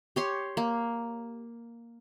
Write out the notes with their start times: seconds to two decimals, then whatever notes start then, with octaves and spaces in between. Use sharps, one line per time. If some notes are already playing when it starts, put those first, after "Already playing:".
0.16 G4 C#5 C6
0.57 A#3